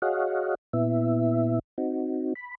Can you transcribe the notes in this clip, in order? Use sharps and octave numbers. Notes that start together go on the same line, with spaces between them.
F#4 G#4 C#5 D#5 F5 F#5
A#2 B3 E4 E5
C4 D#4 F#4
B5